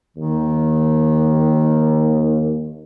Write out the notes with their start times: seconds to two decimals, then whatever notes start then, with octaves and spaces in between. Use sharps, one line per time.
0.17 D#2 D#3